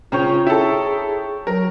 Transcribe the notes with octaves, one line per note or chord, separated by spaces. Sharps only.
C#3 C#4 F4 C#5 G5 A#5
E4 G#4 A4
F#3 A#4